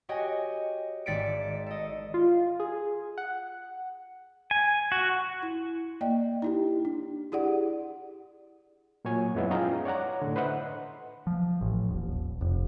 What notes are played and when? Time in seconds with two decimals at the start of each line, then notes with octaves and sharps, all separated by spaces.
0.09 F#4 G4 C#5 D#5 G5 G#5
1.06 G#1 D5 A6 B6 C#7 D7
1.66 A4 D#5
2.14 F4
2.60 G#4
3.18 F#5
4.51 G#5
4.92 F#4
5.43 E4
6.01 A#3 D5 D#5 G5
6.42 D#4 E4 G4
6.85 D4
7.32 E4 G4 G#4 D5 F#5
9.05 A#2 F#3 C#5 G#5
9.35 F#2 F3 G#3 B3 E4
9.51 C#4 D#4 F4 G#4 G5 A#5
9.85 C#5 D5 F#5 A#5
10.22 A2 D3
10.36 B4 C5 D#5 E5 F#5
11.27 F3
11.61 A1
11.89 D#1
12.41 F1